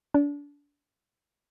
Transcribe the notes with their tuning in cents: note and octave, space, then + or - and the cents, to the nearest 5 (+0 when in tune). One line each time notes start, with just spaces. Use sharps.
D4 -30